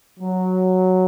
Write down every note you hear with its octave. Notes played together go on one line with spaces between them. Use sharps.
F#3